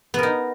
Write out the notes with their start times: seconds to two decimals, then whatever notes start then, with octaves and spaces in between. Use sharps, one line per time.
0.14 B3
0.18 A#4
0.23 D#4